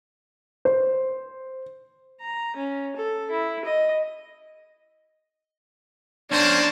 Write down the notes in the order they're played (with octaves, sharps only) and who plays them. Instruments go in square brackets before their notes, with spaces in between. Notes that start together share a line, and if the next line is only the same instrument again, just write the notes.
[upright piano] C5
[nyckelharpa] A#5
C#4
A4
E4
D#5
[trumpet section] A#3 [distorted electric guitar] C#4 C5 [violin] D4 [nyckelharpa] A5